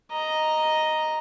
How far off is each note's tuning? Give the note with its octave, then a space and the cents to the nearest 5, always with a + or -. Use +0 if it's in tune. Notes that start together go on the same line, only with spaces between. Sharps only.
D#5 +0 A#5 +0